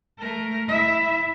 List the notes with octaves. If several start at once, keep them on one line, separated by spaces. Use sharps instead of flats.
A3 A#4
E4 E5